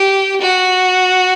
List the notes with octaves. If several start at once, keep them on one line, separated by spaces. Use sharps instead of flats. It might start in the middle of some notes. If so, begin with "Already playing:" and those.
Already playing: G4
F#4